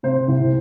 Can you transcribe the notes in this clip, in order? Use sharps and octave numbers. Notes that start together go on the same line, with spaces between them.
C3 C5
C2